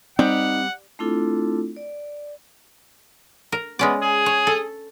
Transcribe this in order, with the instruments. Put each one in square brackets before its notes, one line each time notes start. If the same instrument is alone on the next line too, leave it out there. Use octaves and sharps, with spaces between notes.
[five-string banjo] G3 [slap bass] C4 [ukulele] D#4 [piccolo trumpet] F#5
[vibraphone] A3 C4 D4 E4 F4 A4
D5
[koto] A#4
[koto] G#3 C#4 D5 [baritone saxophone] B3
[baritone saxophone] G#4
[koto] C#5
A4